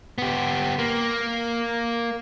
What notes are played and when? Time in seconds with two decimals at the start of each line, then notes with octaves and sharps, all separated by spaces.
0.18 B3 G4
0.79 A#3